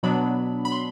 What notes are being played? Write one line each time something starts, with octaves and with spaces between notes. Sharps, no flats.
B2 F#3 B3 D4 B5
B5
C6